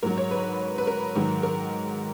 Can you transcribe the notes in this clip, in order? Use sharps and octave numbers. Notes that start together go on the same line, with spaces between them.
G#2 F#3 A#4
C#5
B4
B4
A#4
G#2 D#3 F#3
A#4